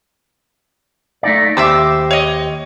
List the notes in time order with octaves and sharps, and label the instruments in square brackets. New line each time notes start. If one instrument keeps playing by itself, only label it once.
[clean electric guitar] A3 D#4 D5
[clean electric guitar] D#2 G4 C5 [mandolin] E5 D6 E6
[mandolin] C#5 D#5